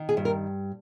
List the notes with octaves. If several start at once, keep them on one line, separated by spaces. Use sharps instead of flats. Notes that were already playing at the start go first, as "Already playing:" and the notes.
Already playing: D#3
G#4
G2
A#4